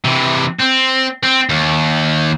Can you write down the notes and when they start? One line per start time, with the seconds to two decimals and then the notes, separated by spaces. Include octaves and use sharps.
0.05 C3 E3
0.59 C4
1.23 C4
1.50 D#2